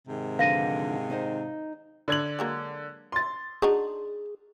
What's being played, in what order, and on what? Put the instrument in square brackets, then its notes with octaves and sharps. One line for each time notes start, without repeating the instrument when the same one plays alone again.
[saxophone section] G#2 C3 D#3
[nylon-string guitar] D3 F3 B4 [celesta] F5 A#6 D#7
[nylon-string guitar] D#4 C5 D#5
[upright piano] D3 G#6 F#7
[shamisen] F#3 G#3 A#3
[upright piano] C6 A6
[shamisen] D4 D#4 F#4 [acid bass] G#4